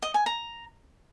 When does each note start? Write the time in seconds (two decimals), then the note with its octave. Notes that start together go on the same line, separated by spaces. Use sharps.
0.02 D#5
0.14 G#5
0.26 A#5